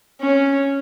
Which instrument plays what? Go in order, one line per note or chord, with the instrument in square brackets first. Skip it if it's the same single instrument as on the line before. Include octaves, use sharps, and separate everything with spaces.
[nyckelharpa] C#4